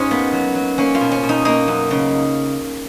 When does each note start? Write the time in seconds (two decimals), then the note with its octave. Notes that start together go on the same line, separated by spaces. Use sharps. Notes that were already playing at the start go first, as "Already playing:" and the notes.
Already playing: G#2 C#4 D#4 F4 G#4
0.11 A#3 B3
0.33 F#3
0.55 F#3
0.78 A#3 C#4
0.95 F4
1.01 B2
1.12 C#4
1.23 B2
1.29 D#4
1.45 A#3 D#4
1.68 F#2
1.91 C#3